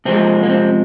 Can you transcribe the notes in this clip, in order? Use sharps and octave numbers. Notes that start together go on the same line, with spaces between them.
C3 F3 G#3 C4
A#3
C4